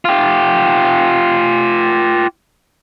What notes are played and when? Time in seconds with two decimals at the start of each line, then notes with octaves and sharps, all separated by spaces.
0.05 F4 G4